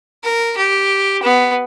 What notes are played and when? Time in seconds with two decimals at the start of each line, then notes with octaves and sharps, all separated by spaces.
0.24 A#4
0.57 G4
1.23 B3